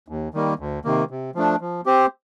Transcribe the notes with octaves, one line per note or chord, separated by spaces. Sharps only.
D#2
D#3 G3 A#3
D2
C3 D#3 A#3
C3
F3 A3 D4
F3
C4 G4 C5